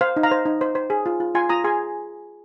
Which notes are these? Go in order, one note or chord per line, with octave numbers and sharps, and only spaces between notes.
C5 F5
D#4
F5 A#5
C5
D#4
C5
C5
G#4
F4
F4
F4 G#5 C6
F4 A#5 D#6
G#4 G#5 C6